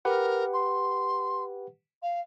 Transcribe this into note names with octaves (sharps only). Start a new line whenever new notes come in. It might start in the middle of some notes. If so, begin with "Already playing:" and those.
G4 A#4 B4 F#5
C6
F5